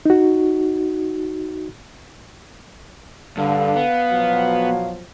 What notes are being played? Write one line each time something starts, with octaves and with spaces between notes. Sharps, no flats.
D#4 F#4
G2 D3 F5
B3
B2 F3 F#3